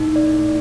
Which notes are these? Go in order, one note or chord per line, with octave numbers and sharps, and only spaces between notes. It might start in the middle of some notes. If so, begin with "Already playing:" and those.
Already playing: A2 D#4
D5